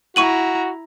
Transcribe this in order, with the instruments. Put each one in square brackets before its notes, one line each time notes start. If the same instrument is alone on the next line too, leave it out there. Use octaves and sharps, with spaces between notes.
[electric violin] E4 A#5 [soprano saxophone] F#4 [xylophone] C#6 D#7 F#7